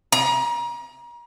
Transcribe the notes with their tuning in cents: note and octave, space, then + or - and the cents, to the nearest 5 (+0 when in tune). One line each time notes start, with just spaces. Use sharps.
A#5 +35